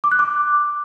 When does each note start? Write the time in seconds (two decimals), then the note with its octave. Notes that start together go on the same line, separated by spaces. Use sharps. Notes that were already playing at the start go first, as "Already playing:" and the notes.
0.04 D6
0.11 F#6
0.19 D6